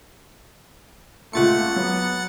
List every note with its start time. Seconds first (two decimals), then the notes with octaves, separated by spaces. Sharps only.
1.33 C#2 A#2 A3 F#5 C6 A6 C#7
1.76 F#3 B3